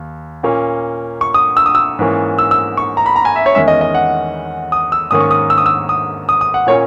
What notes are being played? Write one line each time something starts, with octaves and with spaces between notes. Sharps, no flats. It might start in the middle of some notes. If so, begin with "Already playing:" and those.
Already playing: D#2
A#2 A#3 C#4
C#6
D#6
E6
D#6
E6
G#2 E3 A#3 C#4
E6
E6
C#6
A#5
B5
A#5
G#5
E5
C#5
E2 D#3 G#3 C#4 E5
D#5
D#5
F#5
D#6
E6
G#2 D#3 A#3 C#4 D#6
C#6
D#6
E6
D#6
E6
D#6
D#6
D#6
F#5
A#2 A#3 C#4 C#5